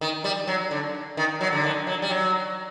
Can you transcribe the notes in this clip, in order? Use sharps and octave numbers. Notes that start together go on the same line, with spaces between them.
D#3
G3
F#3
D3
D#3
F#3
D3
D#3
F#3
G3
F#3